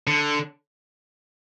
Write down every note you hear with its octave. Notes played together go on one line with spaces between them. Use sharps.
D3